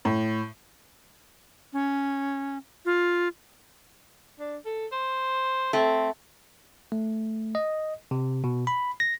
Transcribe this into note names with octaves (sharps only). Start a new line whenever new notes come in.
A2
C#4
F4
D4
A4
C5
A3 C4
A3
D#5
C3
B2
B5
A#6